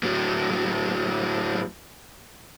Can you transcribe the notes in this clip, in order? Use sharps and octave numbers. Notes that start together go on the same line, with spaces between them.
A2 F#3